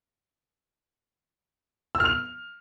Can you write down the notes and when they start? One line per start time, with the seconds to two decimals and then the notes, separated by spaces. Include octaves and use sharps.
1.95 E6
2.00 F6
2.05 F7